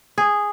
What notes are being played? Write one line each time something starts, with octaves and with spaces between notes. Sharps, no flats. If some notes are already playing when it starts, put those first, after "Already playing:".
G#4